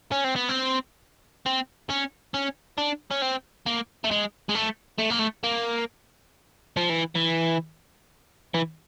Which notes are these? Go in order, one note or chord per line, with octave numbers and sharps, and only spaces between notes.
C#4
C4
B3
C4
C4
C#4
C#4
D4
C#4
C4
A#3
A3
G#3
G#3
A3
A3
A#3
A3
A#3
F3
E3
E3
E3